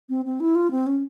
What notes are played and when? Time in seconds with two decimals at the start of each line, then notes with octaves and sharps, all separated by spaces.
0.09 C4
0.25 C4
0.40 E4
0.55 F4
0.71 C4
0.87 C#4